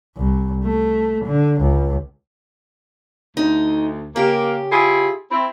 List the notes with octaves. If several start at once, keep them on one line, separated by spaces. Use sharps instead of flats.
C2
A3
D3
C#2
D2 D#4
C#3 A#3 G4
E4 F4 G#4
C4 E4